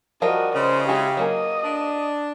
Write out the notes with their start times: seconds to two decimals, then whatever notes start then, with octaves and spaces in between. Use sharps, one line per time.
0.22 F3 G3 F#4 A#4 D#5
0.55 C#3 C5 D#5
0.89 G#3 E4 F#4 G4
1.17 F#3 A#3 G#4 D#5
1.64 D4